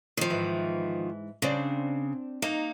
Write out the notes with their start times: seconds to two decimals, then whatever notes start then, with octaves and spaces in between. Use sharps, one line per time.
0.17 D#3 F3
0.30 G#2 E3
1.42 C#3 C4 D4 D5
2.42 A#3 D#4